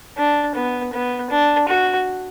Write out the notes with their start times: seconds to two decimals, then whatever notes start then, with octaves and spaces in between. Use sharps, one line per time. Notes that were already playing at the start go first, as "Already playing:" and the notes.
0.17 D4
0.55 B3
0.93 B3
1.31 D4
1.69 F#4